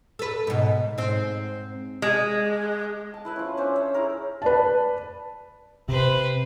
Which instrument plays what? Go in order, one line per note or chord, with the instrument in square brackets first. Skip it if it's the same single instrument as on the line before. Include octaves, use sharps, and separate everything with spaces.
[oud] A4 B4
G#2 B2
G#2 C4
[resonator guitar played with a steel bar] G#3
[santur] A5
E4 B4 E5
F3 C#4
C#4 D4 C5 E5
C#5 E5
E4 G#4 A#4
[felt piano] B4 D5 A5
[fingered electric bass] C3 [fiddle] B4 C5